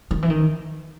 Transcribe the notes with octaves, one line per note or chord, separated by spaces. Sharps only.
D#3
E3
D#3